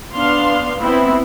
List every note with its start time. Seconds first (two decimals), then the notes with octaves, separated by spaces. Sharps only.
0.14 B3 D4 F5 C6
0.78 B3 C4 E4